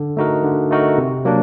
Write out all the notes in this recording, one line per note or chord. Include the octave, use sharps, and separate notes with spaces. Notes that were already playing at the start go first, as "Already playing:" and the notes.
Already playing: D3
A3 D#4 F#4 A#4
D3
A3 D#4 F#4 A#4
C3
F#3 A#3 D4